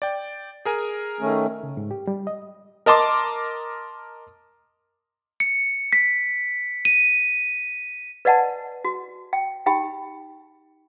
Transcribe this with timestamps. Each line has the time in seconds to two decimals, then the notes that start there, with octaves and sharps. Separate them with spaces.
0.02 D5 G5
0.65 G#4 A#4 G#5
1.20 D#3 A3 C#4
1.63 C#3
1.77 G#2
1.91 G4
2.07 G3
2.27 D#5
2.86 A#4 D#5 A5 C6 D6
5.40 C#7
5.93 B6
6.85 D#7
8.25 B4 D5 D#5 F#5 G#5 A5
8.84 F#4
9.33 G5
9.66 D#4 G4 G5 B5